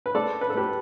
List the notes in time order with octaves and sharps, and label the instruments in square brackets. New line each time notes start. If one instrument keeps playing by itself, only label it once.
[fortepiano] B4
A3 A4 D5
B4
A4
A3 G4 B4